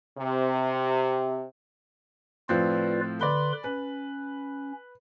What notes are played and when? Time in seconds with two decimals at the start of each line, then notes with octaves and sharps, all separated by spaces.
0.19 C3
2.49 A2 F3 C4 F4 B4 D5
3.21 D3 B4 D5 B5 C6
3.64 C#4 B4